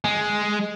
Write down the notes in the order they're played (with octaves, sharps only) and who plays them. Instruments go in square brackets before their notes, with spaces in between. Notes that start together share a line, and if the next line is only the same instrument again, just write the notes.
[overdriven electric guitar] G#3